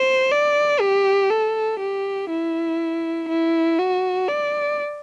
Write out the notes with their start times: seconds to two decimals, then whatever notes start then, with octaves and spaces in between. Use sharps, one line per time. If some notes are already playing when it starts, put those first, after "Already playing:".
Already playing: C5
0.32 D5
0.81 G4
1.30 A4
1.80 G4
2.30 E4
3.29 E4
3.79 F#4
4.29 D5